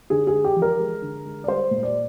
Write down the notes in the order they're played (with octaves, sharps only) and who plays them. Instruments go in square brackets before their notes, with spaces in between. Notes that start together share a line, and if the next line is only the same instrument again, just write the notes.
[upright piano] D3 G#4
G#4
G#3
G4
F3
A#4
G#3
D3
G#3
D5
G3 C5
A#2
D5